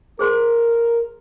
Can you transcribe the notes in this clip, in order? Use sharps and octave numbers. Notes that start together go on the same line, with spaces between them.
G#4 A#4 C5 C6